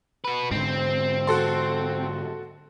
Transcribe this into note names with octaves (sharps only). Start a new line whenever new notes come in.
F#4 B4
G#2 D3 C4
F#4 A4 C6